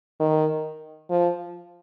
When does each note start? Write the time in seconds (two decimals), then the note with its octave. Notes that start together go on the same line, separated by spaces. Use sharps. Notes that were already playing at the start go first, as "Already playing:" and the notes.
0.20 D#3
1.10 F3